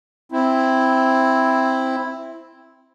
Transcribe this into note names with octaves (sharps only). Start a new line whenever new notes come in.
C4 E4